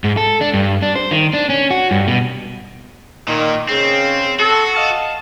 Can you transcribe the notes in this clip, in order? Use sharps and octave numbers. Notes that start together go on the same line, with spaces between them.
G#2
A4
D4
G2
D4
C5
D#3
D4
C#4
F#4
G2
B2
A#2 D#3
C#3 C4
F#4 A4
D#5 F5 A5